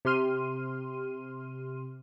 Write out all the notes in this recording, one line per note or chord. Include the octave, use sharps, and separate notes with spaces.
C3 G4 C6 F6 D#7